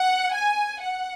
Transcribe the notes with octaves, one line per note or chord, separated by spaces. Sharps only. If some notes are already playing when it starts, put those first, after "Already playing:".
Already playing: F#5
G#5
F#5